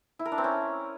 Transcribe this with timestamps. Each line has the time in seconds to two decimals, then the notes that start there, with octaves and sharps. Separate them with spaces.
0.19 E4
0.25 A#4
0.32 D4
0.38 C4
0.44 C#4